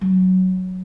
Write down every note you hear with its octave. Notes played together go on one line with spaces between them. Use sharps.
F#3